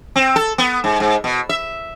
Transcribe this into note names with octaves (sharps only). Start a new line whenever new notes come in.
C4
A4
B3
G#2
G#2
B2
E5